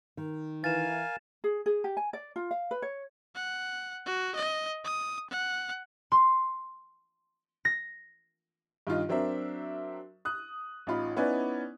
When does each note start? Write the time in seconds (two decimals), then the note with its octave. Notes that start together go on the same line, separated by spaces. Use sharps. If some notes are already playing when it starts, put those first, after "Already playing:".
0.17 D#3
0.64 E3 A#4 F5 G#5 A6 E7
1.44 G#4
1.66 G#4
1.84 G4
1.97 G#5
2.13 D5
2.36 F4
2.51 F5
2.71 B4
2.82 C#5
3.35 F#5
4.06 F#4
4.36 D#5
4.84 D#6
5.30 F#5
6.12 C6
7.65 A#6
8.87 G2 D#3 F4 D#5
9.09 F#3 C4 D4 A#4 E5
10.25 D#6 F#6
10.87 A1 D#4 F4 B5
11.16 B3 C#4 D#4 E4 B4 D5